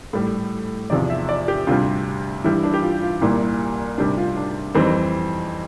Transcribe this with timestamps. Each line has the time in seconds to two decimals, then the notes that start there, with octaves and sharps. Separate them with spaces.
0.13 A2 G3
0.90 E2 C3 F3 D5
1.10 E5
1.29 D5
1.48 G4
1.67 D2 C3 G3 F4
2.44 G2 E3 G3 E4
2.64 D4
2.74 G4
2.82 F4
3.02 F4
3.21 C2 A#2 G3 E4
3.98 D2 C3 G3 D4
4.17 F4
4.37 D4
4.75 F2 E3 G3 C4